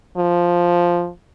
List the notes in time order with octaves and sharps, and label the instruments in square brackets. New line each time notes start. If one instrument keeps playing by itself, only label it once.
[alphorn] F3